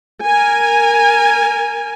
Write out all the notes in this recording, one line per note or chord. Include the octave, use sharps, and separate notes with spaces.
A#4 G#5